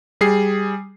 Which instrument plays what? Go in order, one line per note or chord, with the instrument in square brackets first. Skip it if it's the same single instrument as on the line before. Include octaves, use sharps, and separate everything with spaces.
[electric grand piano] G3 G#4 C7